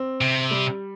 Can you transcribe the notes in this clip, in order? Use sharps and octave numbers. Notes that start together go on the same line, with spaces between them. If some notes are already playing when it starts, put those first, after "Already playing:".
Already playing: C4
C3
G3